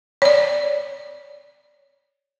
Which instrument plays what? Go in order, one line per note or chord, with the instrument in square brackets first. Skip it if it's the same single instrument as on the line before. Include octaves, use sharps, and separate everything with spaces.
[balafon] C#5 D5